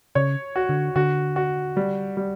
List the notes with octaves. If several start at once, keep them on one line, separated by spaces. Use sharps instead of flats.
C#3 C#5
F#4
D3
D3 F#4
F#4
G3
G3